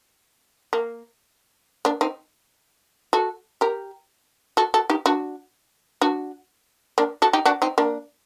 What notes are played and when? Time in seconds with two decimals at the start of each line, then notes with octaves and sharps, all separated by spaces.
0.73 A#3
1.85 A#3 D4
2.01 C4 D#4
3.13 F#4 A4
3.61 G4 A#4
4.57 F#4 A4
4.74 F#4 A4
4.90 D#4 G4
5.06 D4 F#4
6.01 D4 F#4
6.98 A#3 D4
7.22 F#4 A4
7.33 D#4 G4
7.45 D4 F#4
7.62 C4 D#4
7.78 A#3 D4